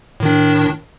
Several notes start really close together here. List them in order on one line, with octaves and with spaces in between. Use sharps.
A2 D#3 D4